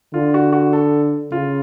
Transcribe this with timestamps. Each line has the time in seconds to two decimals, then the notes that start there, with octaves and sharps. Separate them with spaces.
0.14 D3 F4
0.34 F#4
0.53 F#4
0.73 A4
1.32 C#3 F4